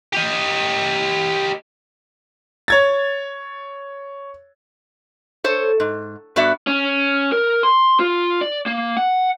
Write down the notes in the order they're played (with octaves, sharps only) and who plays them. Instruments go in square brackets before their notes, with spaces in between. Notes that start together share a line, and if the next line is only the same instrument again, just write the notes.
[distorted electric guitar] G4 D#5
[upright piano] C#5 G#6 A6
[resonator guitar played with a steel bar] A4 C5 C#5
G#2
G2 B3 F#4 D5 E5
[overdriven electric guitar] C#4
A#4
C6
F4
D5
A#3
F#5